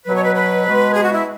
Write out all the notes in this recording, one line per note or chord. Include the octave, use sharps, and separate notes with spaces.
B2 F#3 B4
C#5
B4
B4
B2 G#3
G#4
F#4
E4